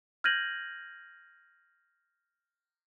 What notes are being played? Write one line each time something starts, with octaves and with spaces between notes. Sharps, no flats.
F6 G6 G#6 A#6 D#7 F#7